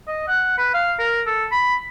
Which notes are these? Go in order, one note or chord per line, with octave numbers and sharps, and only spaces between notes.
D#5
F#5
B4
F5
A#4
A4
B5